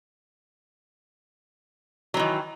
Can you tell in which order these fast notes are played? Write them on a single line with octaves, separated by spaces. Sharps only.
F#3 E3 D#3